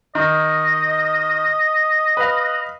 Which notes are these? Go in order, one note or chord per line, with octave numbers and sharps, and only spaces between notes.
D#3 D#5
B4 F5